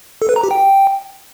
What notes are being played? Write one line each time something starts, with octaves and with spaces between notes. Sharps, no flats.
A4
B4
A#5
G4
G5